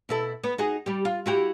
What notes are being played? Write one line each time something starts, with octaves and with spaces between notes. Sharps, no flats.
B2 E4 A4
B3
D#4 F#4 G#4
G3 G4
F4
E4 F#4 G4